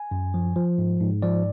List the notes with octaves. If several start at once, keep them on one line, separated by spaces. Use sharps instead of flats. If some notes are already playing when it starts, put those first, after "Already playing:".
Already playing: G#5
F#2
F3
F3
G#2
G#2
F3 D5